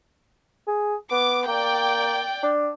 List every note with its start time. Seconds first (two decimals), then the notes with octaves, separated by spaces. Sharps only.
0.67 G#4
1.11 B3 D6
1.47 A#3 D5 G5
2.43 D4